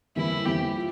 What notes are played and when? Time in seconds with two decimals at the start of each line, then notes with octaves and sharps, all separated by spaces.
0.16 F2 E3 G3 A#3 E4
0.45 F2 E3 G3 A#3 G4
0.76 F4